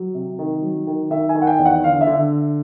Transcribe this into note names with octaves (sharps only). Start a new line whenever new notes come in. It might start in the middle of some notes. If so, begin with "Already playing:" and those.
Already playing: F#3
C3
D#3
F#3
D#3
D#3 E5
G#5
D#3
F#5
G5
E2
F#5
D3 F5
E5
D3